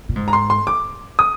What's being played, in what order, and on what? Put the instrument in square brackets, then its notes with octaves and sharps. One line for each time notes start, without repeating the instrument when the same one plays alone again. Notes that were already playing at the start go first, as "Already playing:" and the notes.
[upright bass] A#2
G#2
[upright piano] A#5
C6
C6
D6
D#6